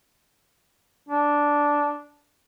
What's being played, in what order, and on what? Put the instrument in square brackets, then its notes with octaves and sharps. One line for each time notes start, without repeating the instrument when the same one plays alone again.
[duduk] D4